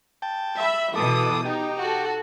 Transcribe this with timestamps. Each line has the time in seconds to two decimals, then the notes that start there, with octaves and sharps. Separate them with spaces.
0.22 G5 A5
0.57 E5 B5
0.95 B2 E3 A4 D6 D#6
1.45 D#4 G4
1.79 F#4 A4